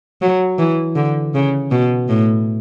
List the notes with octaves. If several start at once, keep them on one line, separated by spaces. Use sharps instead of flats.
F#3
E3
D3
C#3
B2
A2